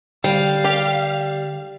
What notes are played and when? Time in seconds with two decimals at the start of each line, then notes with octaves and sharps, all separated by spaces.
0.24 D3 G3 F5 G6 C7
0.64 G4